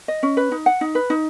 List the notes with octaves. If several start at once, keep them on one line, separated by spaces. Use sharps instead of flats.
D#5
C#4
B4
D#4
F#5
D#4
B4
D#4